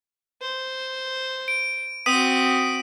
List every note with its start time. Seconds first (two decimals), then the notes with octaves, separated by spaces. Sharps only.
0.42 C5
1.48 D7
2.06 C4 F#4 D#6 B6 D#7